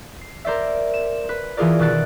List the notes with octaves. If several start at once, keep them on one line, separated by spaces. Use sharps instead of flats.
C7
A#4 C5 D5 E5
E7
B4
E3 E4 F4 G#4 A#4 D5
B2 D#3 E5 F#6 A6 D7